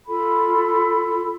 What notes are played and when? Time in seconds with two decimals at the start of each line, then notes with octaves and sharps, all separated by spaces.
0.07 F4 A4 B5